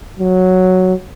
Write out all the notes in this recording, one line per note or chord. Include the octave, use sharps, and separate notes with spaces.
F#3